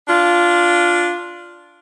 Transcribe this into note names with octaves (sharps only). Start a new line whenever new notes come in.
D4 F4